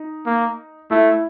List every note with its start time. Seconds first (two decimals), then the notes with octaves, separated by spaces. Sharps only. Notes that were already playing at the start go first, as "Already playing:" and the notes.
Already playing: D#4
0.26 A#3
0.91 A3 E4